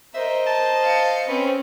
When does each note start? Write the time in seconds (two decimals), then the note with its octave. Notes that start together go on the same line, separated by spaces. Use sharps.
0.14 A#4 C5 D#5 E5
0.47 A5
0.82 F5 C#7
1.28 C4 C#4 B4